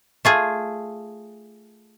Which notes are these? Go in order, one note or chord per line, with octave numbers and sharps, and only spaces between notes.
A3 F4 G#4